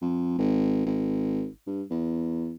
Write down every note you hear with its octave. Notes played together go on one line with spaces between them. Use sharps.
F2
G#1
G#1
G2
E2